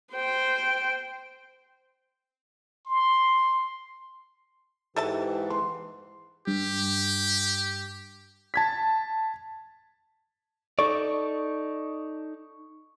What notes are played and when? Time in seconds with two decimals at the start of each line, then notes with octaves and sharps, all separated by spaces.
0.13 C5 G5
2.86 C6
4.96 G#2 E3 G4 A4 E5 A5
5.50 C6
6.47 G2 G4
8.54 A5 G#6 B6
10.79 D#4 A4 D5 C#6